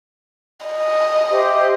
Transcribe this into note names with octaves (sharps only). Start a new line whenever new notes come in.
D#5
G4 C5 E5